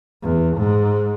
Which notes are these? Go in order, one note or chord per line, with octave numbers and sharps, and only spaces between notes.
E2
G#2